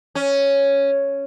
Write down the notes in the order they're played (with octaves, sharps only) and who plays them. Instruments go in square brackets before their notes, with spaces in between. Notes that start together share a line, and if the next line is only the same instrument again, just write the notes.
[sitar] C#4